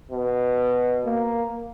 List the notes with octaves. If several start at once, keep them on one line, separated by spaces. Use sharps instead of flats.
B2
A#3